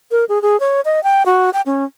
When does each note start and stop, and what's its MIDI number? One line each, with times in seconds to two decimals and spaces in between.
0.11 0.25 70
0.29 0.42 68
0.42 0.59 68
0.60 0.81 73
0.85 1.03 75
1.04 1.23 79
1.26 1.50 66
1.54 1.61 79
1.66 1.85 61